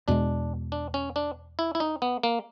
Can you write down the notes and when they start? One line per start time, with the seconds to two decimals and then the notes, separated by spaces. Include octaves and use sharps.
0.08 E2 B2 G#3 D4
0.72 D4
0.94 C#4
1.16 D4
1.59 E4
1.75 E4
1.80 D#4
2.02 B3
2.23 A#3